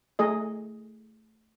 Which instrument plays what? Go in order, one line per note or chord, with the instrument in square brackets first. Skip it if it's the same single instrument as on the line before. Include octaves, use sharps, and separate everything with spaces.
[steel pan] A3 G#4 D#5